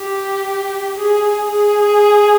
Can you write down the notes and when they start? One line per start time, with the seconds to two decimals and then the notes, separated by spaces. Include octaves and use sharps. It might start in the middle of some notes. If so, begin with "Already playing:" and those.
Already playing: G4
0.98 G#4
1.50 G#4